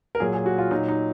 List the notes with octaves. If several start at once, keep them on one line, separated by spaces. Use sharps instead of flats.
A#4
A#2 F#3 G#4
G#4
F#4
F4
A#2 F#3 D#4
D#4